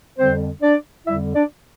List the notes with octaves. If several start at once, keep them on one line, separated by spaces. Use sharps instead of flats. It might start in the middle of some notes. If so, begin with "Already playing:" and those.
F2 D3 G3 C4 C5
D4 D5
F2 D3 G3 E4 E5
D4 D5